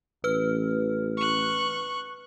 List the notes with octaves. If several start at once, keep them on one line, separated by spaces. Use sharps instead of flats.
A1 B4 F6
C#6 F#6